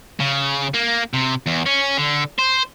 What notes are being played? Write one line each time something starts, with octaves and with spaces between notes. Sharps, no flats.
C#3
A#3
C3
E2
C#4
D3
C5